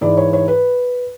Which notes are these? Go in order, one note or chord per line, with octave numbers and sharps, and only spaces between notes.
G#2 E3 D5
C#5
C#5
B4